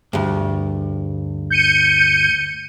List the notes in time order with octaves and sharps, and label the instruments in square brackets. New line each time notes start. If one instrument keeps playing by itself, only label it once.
[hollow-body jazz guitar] D2 G2
[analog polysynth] G6 C#7 D#7